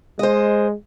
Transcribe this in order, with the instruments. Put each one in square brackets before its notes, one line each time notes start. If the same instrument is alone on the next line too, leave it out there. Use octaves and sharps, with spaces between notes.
[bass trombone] G#3 [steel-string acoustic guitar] C5 D#5